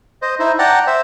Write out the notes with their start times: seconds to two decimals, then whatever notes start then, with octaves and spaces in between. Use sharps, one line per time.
0.22 C5 D#5
0.39 D#4 E4 C5
0.59 D5 F#5 G5 A5 A#5
0.87 C5 E5